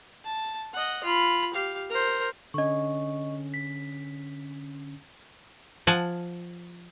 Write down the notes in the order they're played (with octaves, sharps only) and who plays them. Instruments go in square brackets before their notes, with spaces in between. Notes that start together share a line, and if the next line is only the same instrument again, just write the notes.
[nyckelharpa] A5
D#5 F#5
F4 B5
G4 F5
A#4 C5
[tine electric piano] D3 C#4 [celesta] D#5 C#6
[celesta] B6
[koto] F3 F#5 G#5 A5